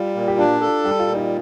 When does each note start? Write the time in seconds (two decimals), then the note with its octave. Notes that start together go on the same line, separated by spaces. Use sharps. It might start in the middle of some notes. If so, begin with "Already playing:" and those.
Already playing: G3 F4
0.15 A#2
0.28 G4
0.38 D4 F4
0.61 A4
0.85 G3 G4
0.99 F4
1.07 A#2
1.15 D#4